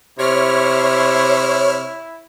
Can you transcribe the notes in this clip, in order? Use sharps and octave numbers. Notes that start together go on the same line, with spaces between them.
C3 E4 C#5 F6